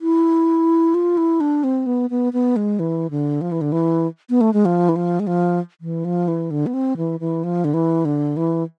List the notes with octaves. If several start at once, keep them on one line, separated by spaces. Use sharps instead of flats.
E4
F4
E4
D4
C4
B3
B3
B3
G#3
E3
D3
F3
E3
D3
E3
B3
A3
G#3
F3
E3
F3
G#3
F3
E3
F3
E3
D3
B3
C4
E3
E3
F3
D3
E3
D3
E3